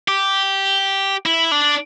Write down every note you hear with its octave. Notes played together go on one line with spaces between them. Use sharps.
G4
E4
D4